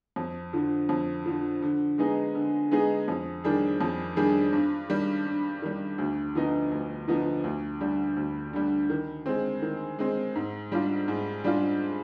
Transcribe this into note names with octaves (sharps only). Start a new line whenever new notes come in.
F2
D3 F3
F2
D3 F3
D3
G#3 B3 D#4 G#4
D3
G#3 B3 D#4 G#4
F2
D#3 G3 D4 G#4
F2
D#3 G3 D4 G#4
G2
D#3 G3
G2
D#3 G3
D2
D3 F3 B3 D#4
D2
D3 F3 B3 D#4
D2
D3 G3
D2
D3 G3
D#3
G#3 C4
D#3
G#3 C4
G#2
G3 D4 F4
G#2
G3 D4 F4